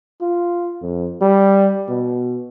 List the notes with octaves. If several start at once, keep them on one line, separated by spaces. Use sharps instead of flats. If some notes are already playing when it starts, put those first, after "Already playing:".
F4
F2
G3
B2